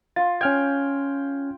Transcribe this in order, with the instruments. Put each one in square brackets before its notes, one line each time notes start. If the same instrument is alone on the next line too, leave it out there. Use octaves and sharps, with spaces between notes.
[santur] F4 [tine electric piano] A6
[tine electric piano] C#4 F6 G#6 [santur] G5